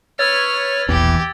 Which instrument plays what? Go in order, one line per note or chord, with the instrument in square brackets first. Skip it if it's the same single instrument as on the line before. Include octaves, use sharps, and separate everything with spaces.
[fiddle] B4 F6 [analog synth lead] C#5 [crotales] E6 G#6 A6
[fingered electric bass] E1 A#1 E2 [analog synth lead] E3 [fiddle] G4